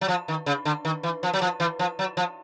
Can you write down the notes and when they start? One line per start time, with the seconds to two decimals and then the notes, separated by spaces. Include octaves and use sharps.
0.01 F#3
0.08 F3
0.28 D#3
0.46 C#3
0.65 D3
0.85 D#3
1.03 E3
1.23 F3
1.33 F#3
1.42 F3
1.60 E3
1.79 F3
1.99 F#3
2.17 F3